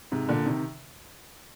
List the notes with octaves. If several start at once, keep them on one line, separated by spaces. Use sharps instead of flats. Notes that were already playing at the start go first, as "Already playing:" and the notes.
G#2 C3
A#2 D3
C3 D#3